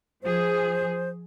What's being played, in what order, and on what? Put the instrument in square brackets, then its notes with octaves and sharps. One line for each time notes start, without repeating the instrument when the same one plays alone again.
[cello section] F3 G#4 [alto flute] C5